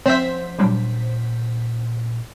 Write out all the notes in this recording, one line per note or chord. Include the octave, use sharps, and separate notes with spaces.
F3 C4 C#4 C5 E5 B6
A#2 F#3 G3 C#4 D4